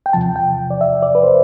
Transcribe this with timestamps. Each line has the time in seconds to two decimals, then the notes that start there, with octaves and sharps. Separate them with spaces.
0.06 G5
0.13 E2 C3 F3 A5
0.36 G5
0.70 D5
0.81 E5
1.02 D5
1.15 B4
1.23 C5